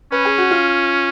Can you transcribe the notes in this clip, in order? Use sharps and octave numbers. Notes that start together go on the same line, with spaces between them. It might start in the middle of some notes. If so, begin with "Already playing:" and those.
C#4 B4
G#4
F#4
F4